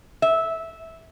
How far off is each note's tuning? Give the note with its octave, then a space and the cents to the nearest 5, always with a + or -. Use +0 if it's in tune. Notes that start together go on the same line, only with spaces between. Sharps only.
E5 -10